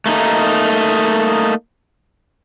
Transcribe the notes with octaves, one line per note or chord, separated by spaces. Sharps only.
A3 A#3 D#4